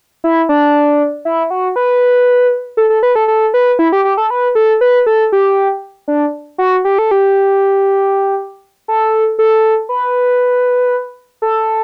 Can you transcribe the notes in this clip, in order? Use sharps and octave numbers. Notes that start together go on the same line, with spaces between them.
E4
D4
E4
F#4
B4
A4
A4
B4
A4
A4
B4
E4
G4
G4
A4
B4
A4
B4
A4
G4
D4
F#4
G4
A4
G4
A4
A4
B4
A4